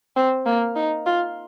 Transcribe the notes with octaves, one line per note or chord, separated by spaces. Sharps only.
C4
A#3
D#4
F4